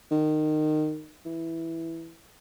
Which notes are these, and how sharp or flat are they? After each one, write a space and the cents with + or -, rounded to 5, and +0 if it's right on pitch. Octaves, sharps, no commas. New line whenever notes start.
D#3 -20
E3 +0